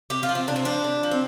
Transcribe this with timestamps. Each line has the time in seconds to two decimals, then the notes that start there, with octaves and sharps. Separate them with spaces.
0.10 C3 G4
0.23 F4
0.29 F3
0.35 C4
0.47 C3 D4
0.56 C4
0.65 F3 D4
0.84 C3
1.03 F3
1.11 C4